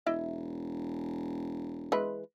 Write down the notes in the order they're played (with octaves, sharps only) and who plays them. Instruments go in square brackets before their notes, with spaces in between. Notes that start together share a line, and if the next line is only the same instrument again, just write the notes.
[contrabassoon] E1 [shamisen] E4 D#5 E5
[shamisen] E3 G#3 B4